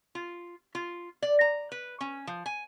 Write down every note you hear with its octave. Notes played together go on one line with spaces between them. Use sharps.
F4
F4
D5
A#5
B4
C#4
F3
G#5